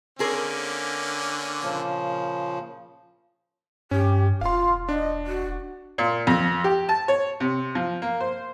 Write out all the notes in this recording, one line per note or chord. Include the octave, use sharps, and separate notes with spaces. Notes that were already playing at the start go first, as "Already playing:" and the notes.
D3 A#3 C4 C#4 G#4 A#4
A#2 C#3 F3
G2 C#4 G4
E1 F4 F5 C6
D4 D#5
F#4
A#2
F2
G4
A5
C#5
C3
F3
A#3
C5